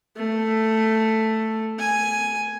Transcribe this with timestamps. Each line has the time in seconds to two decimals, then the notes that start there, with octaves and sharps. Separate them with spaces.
0.16 A3
1.79 G#5